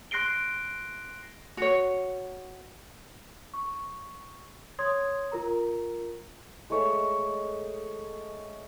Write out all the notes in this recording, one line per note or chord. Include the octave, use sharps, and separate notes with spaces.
C6 F#6 A#6 C7 D7 G7
F#4 C#5
C#6
C#5 C6 D#6 G#6
F4 A#4 A#5
G#3 A3 C#5 D#5